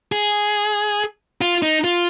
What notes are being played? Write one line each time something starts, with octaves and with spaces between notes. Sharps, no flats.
G#4
F4
D#4
F4